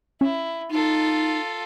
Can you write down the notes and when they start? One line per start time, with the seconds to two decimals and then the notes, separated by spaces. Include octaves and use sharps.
0.21 C#4 E4
0.71 D#4 F4 A4